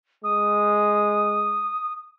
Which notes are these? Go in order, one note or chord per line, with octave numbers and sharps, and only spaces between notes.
G#3 D#6